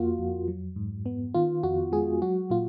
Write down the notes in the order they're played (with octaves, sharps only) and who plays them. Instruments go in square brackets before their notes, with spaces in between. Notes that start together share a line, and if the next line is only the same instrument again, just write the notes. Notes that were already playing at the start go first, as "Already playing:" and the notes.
Already playing: [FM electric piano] F2 A#3 F4 F#4
F2
F#3
G#2
B3
D#3 F4
F2 F#4
G#3 G#4
F#3 F#4
A#2 F4